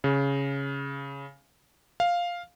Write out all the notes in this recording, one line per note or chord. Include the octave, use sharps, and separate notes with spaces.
C#3
F5